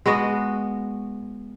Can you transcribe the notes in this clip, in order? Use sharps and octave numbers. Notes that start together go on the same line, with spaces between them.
G#3 B3 F#4 D#5